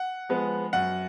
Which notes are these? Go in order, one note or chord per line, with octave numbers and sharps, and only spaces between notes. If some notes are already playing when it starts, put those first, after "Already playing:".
Already playing: F#5
F3 G#3 B3
F#2 F#5